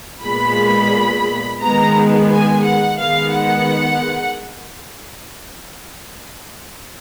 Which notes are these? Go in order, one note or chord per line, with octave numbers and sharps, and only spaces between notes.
A#2 G#3 B3 B5
D#3 G#3 B3 A#5
G#5
F#5
D#3 G#3 B3 F5
F#5